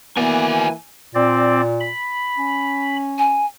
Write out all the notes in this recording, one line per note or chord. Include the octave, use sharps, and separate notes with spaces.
E3 A#3 B3 F#4 D5 G#5
A#2 C4 D5
B5
C#4
G#5